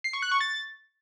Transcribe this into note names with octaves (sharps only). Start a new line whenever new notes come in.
C7
C#6
F#6
C#6
A6